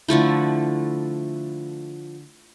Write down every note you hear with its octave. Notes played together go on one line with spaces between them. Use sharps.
D3 F3 A3 E4